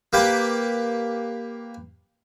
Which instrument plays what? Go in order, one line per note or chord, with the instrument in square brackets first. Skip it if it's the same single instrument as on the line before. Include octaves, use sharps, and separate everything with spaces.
[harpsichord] A#3 G4 B4